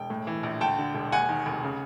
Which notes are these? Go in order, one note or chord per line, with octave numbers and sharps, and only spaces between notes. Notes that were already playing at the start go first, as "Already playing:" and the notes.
Already playing: E1 G5
A2
E3
A#1
D2 G5 A5
D3
E1
D#2 F#5 G#5
D#3
F1
C#3